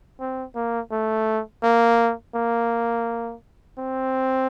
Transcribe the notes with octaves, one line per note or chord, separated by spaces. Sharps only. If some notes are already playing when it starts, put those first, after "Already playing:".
C4
A#3
A3
A#3
A#3
C4